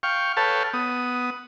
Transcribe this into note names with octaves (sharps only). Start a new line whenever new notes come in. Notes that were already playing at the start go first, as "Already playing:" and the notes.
F5 G5 C#6
A4 B4 C#5 F5 G5 A5
B3 D#6